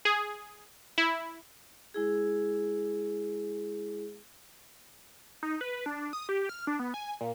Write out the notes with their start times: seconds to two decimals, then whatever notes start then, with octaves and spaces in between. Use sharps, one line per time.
0.05 G#4
0.98 E4
1.94 G#3 E4 G#4
5.43 D#4
5.61 B4
5.86 D4
6.13 D#6
6.29 G4
6.49 F6
6.67 D4
6.79 B3
6.94 G#5
7.21 A#2